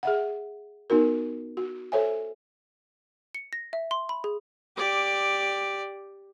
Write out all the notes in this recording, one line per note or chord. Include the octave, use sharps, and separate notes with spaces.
G#4 E5 F#5
B3 D#4 F#4 A#4
F#4
A4 C5 C#5 E5 G#5
C#7
A#6
E5
C6
B5
G#4
G4 D5